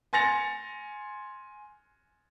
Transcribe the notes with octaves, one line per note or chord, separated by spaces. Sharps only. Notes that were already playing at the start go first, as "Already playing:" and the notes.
G#5 C6 A6 A#6 C#7 F7